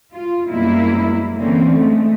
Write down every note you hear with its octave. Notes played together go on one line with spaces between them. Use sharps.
F4
F#2 B2 G3 G#3 A#3 E4
D3 E3 A#3 C4 C#4
G#3 A3